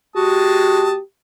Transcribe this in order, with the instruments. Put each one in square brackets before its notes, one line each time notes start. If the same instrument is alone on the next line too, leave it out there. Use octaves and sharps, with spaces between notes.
[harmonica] G#3 A5 D#6 [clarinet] F#4 [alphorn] G4